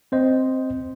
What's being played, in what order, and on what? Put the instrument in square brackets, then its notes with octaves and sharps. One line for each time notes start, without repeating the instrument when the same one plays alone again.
[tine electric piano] C4 C5 D#5